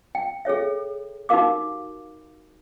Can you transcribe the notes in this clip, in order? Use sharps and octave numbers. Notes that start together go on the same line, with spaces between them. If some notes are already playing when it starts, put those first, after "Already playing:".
G5
G#4 A4 C#5 E5
D#4 F#4 G4 A#4 F5 D6